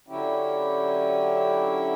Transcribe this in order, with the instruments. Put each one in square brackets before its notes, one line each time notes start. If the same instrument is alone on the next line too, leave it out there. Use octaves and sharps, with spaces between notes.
[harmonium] D3 F#3 C#4 E4 G4